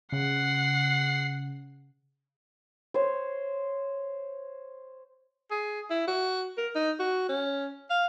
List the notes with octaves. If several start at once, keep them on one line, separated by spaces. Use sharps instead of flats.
C#3 F#5 C7
C5 C#5
G#4
E4
F#4
A#4
D#4
F#4
C#4
F5